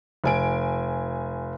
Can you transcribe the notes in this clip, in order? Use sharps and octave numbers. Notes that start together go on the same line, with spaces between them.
F1 G#5 D7